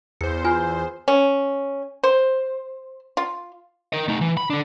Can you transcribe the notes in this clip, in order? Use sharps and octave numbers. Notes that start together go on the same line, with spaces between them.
E2 C5 C#7
F4 G#5 F6
C#4
C5
F4
A#4 D#5
A3 D#4
E3
B5
D3 D4